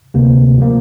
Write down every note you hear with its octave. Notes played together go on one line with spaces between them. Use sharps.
D2 C3 A#3
A#2 F3 A#3